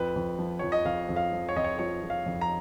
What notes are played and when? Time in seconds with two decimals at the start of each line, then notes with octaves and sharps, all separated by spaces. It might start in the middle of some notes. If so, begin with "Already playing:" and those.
Already playing: F2 B4
0.16 F2
0.39 F3
0.59 F2 C#5
0.72 D#5
0.85 F2 F5
1.09 F2
1.16 F5
1.33 F3
1.49 C#5
1.56 F2 D#5
1.64 C#5
1.79 F3 C#5
2.03 F3
2.10 F5
2.26 F2
2.41 A#5